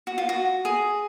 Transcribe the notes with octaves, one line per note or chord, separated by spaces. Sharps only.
F#4
F4
F#4
G#4